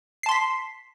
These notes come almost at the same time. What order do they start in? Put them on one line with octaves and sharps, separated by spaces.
C7 A5 C6 B6